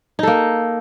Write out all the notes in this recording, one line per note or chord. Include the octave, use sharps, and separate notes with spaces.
A#3 D#4 A4